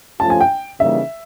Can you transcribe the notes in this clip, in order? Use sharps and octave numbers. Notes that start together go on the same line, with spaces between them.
F3 A3 C#4 F4 A5
G#5
G5
C#3 E3 G3 A#3 D#4 E5